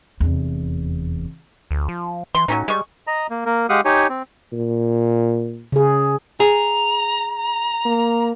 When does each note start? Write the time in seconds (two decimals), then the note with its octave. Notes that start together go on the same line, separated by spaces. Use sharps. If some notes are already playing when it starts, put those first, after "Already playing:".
0.20 F1 E2
1.71 D2
1.88 F3
2.35 E3 C6
2.48 A2 F#3 C#4 D#4
2.68 G3 G#3 C#6
3.07 D#5 A#5
3.30 A#3
3.46 A#3 A#4
3.69 G#3 G4 F5 F#5 D#6
3.85 D#4 G4 C#5 G#5
4.10 C4
4.52 A#2
5.72 C#3 G#4
6.40 G#4 A#5
7.86 A#3